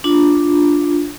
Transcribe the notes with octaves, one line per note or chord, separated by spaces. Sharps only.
D4 F4